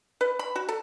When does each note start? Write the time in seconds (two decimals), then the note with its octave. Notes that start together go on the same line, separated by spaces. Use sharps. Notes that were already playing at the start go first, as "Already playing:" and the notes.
0.21 B4
0.39 B5
0.55 F#4
0.69 A4